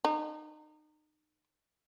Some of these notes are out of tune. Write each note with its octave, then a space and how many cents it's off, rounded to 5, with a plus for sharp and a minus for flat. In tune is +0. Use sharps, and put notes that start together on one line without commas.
D#4 -30